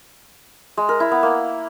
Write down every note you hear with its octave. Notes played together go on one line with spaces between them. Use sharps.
G#3
A#4
E4
B3
A#3